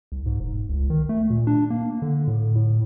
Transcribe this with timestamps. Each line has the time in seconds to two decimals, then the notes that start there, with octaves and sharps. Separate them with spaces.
0.12 C2
0.26 G#2
0.40 E1
0.69 C#2
0.90 D#3
1.09 A3
1.30 A#2
1.47 D4
1.70 A#3
2.02 D3
2.27 A2
2.56 A2